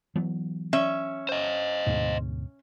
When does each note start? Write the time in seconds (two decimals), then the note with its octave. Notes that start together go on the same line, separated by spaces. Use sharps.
0.16 E3 F#3 B3
0.73 C#4 E5
1.29 C5 D#5
1.87 D2 G#2 B2